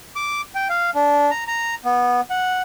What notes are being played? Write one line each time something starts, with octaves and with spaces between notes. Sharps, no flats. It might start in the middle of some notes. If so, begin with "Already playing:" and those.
D6
G5
F5
D4
A#5
A#5
B3
F#5